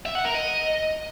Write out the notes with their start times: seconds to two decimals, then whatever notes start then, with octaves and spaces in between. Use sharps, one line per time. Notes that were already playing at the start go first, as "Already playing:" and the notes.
0.06 E5
0.15 F#5
0.25 A#4
0.34 D#5